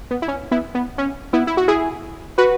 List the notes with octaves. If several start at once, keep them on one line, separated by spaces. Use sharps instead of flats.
B3
E4
C#4
B3 E4
B3
C#4
B3 E4
E4
F#4
E4 G#4
F#4 B4